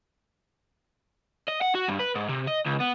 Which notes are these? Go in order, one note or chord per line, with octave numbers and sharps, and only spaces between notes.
D#5
F#5
F#4
G2
B4
G#2
C3
D#5
C#2
B3